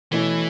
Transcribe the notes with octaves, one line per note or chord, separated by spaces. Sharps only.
B2 E3 A3 C#4 E4